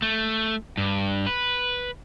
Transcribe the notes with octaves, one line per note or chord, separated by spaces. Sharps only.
A3
G2
B4